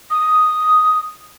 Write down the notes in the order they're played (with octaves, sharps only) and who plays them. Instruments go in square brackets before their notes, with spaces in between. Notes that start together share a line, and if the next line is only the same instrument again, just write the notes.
[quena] D#6